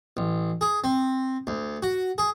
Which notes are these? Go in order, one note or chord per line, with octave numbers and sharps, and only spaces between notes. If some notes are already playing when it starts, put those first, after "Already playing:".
A1
G#4
C4
D2
F#4
G#4